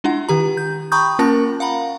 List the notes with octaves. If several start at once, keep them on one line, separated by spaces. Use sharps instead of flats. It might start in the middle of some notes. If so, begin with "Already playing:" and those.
G#3 D4 E4 F4 F#5
D#3 G4 A#5
G6
G5 A#5 B5 C#6 D#6 G6
A#3 C#4 F4 A#4 A5 A#6
F5 F#5 A#5 B5